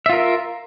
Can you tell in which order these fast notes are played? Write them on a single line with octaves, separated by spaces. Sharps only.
E5 F4 A#4